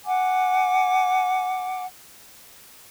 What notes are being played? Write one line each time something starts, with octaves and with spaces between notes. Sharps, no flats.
F#5 G#5 D6